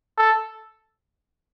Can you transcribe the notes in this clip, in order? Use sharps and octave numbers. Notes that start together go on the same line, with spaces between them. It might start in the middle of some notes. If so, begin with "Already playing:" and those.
A4